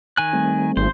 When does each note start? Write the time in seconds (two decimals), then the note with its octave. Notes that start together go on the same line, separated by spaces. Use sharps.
0.17 D#3 G#5 F#6
0.33 G3 A3 C4
0.77 G#1 C5